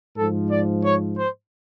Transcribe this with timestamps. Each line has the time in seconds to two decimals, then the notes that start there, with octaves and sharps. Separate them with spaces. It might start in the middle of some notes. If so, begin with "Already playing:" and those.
0.17 G#2 F3 A4
0.50 D5
0.84 C#5
1.18 C5